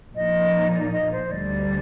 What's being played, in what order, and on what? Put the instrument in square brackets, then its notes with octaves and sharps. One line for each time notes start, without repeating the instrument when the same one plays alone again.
[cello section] A#2 F3 A#3 D#4 [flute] D#5
[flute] D5
D#5
C5
[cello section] D2 D3 G3 [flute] D5